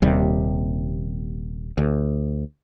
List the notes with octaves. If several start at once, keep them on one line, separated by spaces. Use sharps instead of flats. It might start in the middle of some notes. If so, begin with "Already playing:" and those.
D#1 D#2 C3 G3
D2